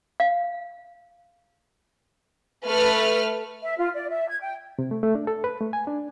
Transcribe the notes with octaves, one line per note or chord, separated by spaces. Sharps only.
F5
A3 B4 F6
E5
F4
D5
E5
G#6
G5
C3
A3
A3
D4
A4
B4
A3
G#5
D4